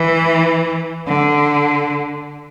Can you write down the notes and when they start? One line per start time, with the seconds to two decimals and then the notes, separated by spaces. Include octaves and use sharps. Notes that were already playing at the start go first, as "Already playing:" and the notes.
Already playing: E3
1.07 D3